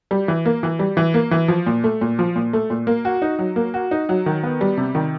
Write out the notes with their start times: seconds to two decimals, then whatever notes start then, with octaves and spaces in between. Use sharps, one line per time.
0.11 G3
0.28 E3
0.46 A#3
0.63 E3
0.79 G3
0.97 E3
1.14 A#3
1.31 E3
1.48 F3
1.66 A#2
1.84 A3
2.01 A#2
2.19 F3
2.36 A#2
2.53 A3
2.70 A#2
2.87 A#3
3.05 F#4
3.22 D#4
3.39 F#3
3.56 A#3
3.74 F#4
3.91 D#4
4.09 F#3
4.26 D#3
4.43 B3
4.61 G3
4.77 C3
4.95 D#3